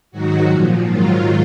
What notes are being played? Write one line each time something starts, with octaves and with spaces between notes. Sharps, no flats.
G#2 D#3 F#3 F#4
A#2 F3
G#2 D#3 F#3 F4